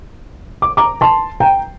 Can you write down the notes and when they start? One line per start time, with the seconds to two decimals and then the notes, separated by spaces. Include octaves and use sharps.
0.62 D6
0.77 A#5 D6
1.01 A5 C6
1.40 G5 A#5